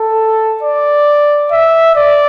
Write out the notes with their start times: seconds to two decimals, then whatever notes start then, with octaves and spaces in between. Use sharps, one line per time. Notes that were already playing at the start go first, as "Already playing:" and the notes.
Already playing: A4
0.63 D5
1.51 E5
1.96 D5